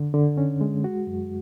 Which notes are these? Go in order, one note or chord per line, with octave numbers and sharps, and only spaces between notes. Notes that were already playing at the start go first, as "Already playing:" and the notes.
Already playing: D3
D3
C#4
G#3
F#4
F#2